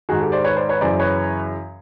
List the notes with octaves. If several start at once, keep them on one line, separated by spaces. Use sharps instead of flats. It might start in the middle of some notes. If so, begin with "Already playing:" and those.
G#2 D#3 F#4 G#4
G4 A4
C5 D5
B4 C#5
C5 D5
B4 C#5
F#2 C#3 E3 C5 D5
B4 C#5